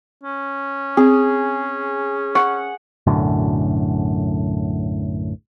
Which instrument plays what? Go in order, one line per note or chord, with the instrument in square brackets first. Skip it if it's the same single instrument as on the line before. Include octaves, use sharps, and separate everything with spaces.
[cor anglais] C#4
[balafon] C4 [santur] G#4
[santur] F#5 [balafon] C#6
[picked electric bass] B1 F#2 A2 D3